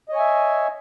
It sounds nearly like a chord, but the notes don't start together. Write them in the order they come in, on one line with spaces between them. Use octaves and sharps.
D#5 C#5 G#5 E5